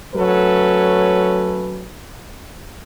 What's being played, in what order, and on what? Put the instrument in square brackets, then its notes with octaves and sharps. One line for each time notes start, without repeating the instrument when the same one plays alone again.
[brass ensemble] F#3 A3 C#4 A4 B4